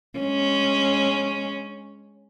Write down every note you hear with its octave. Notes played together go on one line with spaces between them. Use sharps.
G#3 C#4